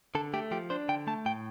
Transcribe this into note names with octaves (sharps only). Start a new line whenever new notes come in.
D3 A4
A3 G4
F3 G4
D4 C5
D3 G5
A3 A5
A2 G5